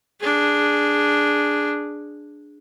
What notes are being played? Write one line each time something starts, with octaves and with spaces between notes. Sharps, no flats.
D4 G#4